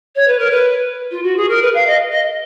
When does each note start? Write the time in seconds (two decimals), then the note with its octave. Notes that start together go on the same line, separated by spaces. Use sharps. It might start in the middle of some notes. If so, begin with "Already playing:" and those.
0.16 C#5
0.27 B4
0.39 A#4
0.51 B4
1.11 F4
1.23 F#4
1.37 G#4
1.49 A#4
1.62 B4
1.74 F5
1.87 D#5
2.12 D#5